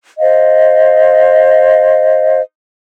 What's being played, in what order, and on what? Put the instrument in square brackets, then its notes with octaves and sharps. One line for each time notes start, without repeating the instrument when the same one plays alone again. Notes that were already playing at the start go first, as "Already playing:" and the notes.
[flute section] C5 D#5 F5